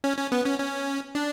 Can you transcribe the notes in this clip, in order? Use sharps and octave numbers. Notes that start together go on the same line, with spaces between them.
C#4
C#4
B3
C#4
C#4
D4